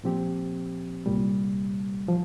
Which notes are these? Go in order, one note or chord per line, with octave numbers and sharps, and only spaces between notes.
A#2 F3 C4 G4
C2 A#2 G3
F3